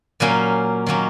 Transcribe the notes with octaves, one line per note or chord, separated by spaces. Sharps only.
A#2 F#3 A#3 C#4 G#5
D#3 F#3 A#3 C#4